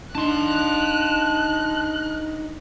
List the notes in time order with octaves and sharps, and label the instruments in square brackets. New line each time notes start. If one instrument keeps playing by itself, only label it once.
[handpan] D4 [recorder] D#4 [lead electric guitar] A5 C6 [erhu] F#6